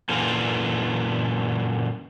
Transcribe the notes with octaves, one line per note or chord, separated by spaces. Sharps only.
F#2 A#2 D3 E3 F4